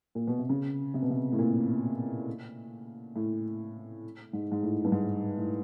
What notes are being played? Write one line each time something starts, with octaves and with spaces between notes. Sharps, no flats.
A#2
B2
C3
C#3
C3
B2
C3
A2
A#2
A2
G#2
G#2
A2
G2
G#2
A2